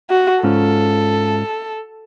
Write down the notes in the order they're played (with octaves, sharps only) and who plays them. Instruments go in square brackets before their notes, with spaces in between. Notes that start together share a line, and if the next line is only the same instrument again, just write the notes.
[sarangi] F#4
[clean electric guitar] G#2 C#4 F4 [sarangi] A4